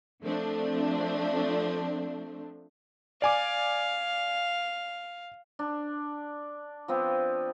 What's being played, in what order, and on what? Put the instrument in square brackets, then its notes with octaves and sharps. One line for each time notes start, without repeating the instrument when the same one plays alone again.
[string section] F3 A3 C4 D4
[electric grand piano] D5 G#5 D6 [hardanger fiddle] F5
[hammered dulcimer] D4
F3 B3 C4